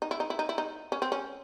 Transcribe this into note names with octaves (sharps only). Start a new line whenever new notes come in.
D#4
E4
D#4
E4
D#4
E4
D#4
C#4
C4
C#4